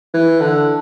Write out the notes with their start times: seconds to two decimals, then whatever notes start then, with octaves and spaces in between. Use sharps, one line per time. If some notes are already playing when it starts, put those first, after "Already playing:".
0.14 E3
0.40 D3